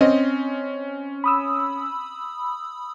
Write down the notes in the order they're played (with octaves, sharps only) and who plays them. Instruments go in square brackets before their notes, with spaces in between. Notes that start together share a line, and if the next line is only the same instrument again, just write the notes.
[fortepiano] C4 D#5 [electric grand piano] C#4
[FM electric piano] B5 D#6 E6